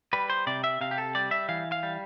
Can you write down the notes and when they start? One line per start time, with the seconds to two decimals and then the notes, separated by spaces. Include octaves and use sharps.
0.13 G3 B4
0.30 C5
0.47 C3 D5
0.64 E5
0.81 C3 F5
0.91 G4
0.98 A4
1.15 G3 D5
1.31 E5
1.49 E3 F5
1.72 F5
1.83 G3